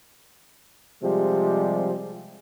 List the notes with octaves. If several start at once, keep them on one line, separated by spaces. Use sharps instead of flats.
C3 F3 G3 G#3